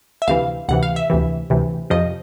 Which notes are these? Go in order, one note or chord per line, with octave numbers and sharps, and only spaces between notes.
E5
D2 C3 E3 F5
D2 C3 E3 F#5
F5
E5
D2 C3 E3
D2 C3 E3
F2 C3 F3 D#5